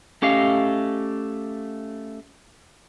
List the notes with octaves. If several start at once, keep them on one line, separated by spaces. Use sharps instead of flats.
A3 C#4 G4 D#5 F5